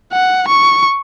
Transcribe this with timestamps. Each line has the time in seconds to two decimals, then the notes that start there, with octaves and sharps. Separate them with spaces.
0.12 F#5
0.48 C#6